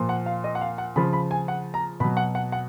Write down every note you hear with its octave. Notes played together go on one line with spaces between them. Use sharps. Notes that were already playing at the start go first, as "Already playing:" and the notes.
Already playing: A#2 F3
F#5
F5
D#5
F#5
F5
F#5
C#3 F3 B5
B5
G#5
F#5
A#5
B2 F#3 B5
F#5
F#5
F#5